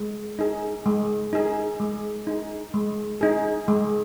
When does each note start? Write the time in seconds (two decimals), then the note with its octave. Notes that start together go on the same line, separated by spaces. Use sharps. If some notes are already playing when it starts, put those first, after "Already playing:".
Already playing: G#3
0.39 D#4 G#4
0.86 G#3
1.33 D#4 G#4
1.80 G#3
2.27 D#4 G#4
2.74 G#3
3.21 D#4 G#4
3.68 G#3